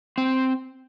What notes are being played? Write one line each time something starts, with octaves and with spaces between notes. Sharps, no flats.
C4